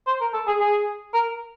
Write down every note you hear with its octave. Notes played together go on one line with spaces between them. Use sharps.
C5
A#4
A4
G#4
G#4
A#4